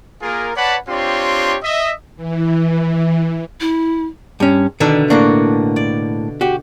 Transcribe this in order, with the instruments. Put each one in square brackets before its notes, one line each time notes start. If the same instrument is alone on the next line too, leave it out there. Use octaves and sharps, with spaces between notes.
[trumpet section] A#3 F4 G#4 A#4
B4 C#5 D5 F#5 A5 B5
C4 D4 F4 G4 C#5 C6
D#5 E5
[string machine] E3
[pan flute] E4
[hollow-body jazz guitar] G2 C#4
[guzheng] B2 D3 E5 [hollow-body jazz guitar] D#3 D4
[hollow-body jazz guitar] A2 A#3 D4 [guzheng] F#4
[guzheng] D5
[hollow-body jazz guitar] F#4 G4